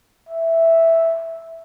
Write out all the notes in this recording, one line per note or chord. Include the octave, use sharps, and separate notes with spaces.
E5